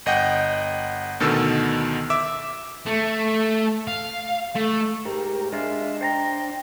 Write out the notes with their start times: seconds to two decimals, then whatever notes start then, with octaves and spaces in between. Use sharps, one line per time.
0.06 G1 D#5 F#5 G5 G6
1.20 D2 B2 D3 D#3 A4 E6
2.10 E5 D6 E6
2.87 A3
3.88 F5
4.55 A3
5.05 G#2 G4 A#4
5.52 G#3 D4 F4 E5
6.01 C5 G5 A5 A#5